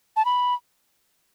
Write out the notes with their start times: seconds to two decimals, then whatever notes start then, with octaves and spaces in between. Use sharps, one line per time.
0.16 A5
0.25 B5